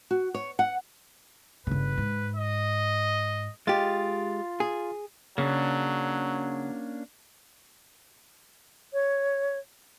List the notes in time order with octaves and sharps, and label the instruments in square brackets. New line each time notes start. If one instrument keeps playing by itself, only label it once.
[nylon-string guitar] F#4
C#5
F#5
[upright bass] G1 C#3 [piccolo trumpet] B4
[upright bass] G#2
[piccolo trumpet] D#5
[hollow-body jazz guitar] G#3 G4 [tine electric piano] F4 A6
[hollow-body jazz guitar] G#4
[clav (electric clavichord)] C#3 [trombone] F#3 [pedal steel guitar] A#3 C#4 D4
[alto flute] C#5